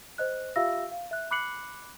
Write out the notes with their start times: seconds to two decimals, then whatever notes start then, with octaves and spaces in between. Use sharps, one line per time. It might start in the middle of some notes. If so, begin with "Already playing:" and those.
0.18 C5 D#5 F#6
0.56 F4 G4 E5 F5 E6 A#6
0.91 F5
1.11 E5 F#6
1.31 B5 D6 F#6 C7 C#7 F#7